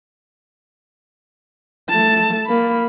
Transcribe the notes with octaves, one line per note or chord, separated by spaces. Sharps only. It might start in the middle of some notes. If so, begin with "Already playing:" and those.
A3 A5
A#3 B5